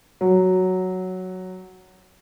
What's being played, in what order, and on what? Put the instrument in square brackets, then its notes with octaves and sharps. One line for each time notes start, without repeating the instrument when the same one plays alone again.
[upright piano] F#3